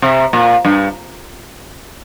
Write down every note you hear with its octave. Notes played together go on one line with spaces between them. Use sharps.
C3
A#2
G2